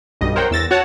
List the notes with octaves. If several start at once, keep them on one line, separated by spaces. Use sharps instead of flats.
B1 G2 D#5
A#4 C5 C#5 F#5 G5
E2 E6 A6 A#6
F#4 C#5 F#5 A5